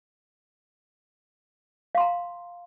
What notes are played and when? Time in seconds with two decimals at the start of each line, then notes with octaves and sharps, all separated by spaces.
1.95 F5
1.98 C6
2.00 A#5